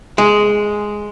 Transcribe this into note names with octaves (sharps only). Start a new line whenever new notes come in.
G#3